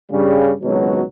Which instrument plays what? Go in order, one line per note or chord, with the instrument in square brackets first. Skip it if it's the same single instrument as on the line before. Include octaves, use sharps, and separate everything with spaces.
[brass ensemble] G2 C#3 G3
G#1 C#2 B2 F#3